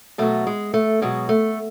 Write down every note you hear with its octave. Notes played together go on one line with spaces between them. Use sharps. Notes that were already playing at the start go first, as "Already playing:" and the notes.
B2 F#3 A3
G#3
A3
B2 F#3 G#3
A3